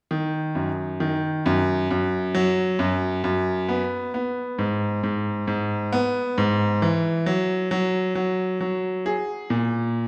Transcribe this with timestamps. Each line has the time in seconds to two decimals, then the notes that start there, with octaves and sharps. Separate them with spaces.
0.11 D#3
0.55 F#2
1.00 D#3
1.46 F#2
1.90 F#2
2.35 F#3
2.79 F#2
3.24 F#2
3.69 B3
4.14 B3
4.59 G#2
5.03 G#2
5.47 G#2
5.93 B3
6.38 G#2
6.82 E3
7.26 F#3
7.71 F#3
8.15 F#3
8.61 F#3
9.06 G#4
9.50 A#2